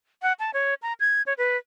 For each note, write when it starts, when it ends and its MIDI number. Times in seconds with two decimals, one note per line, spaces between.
0.22 0.33 78
0.39 0.51 81
0.54 0.74 73
0.82 0.93 82
1.00 1.22 92
1.26 1.33 73
1.38 1.57 71